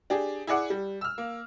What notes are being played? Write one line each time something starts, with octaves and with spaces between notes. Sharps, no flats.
D4 G4 G#4
E4 G#4 D5 F#5
G3
E6 F6
A#3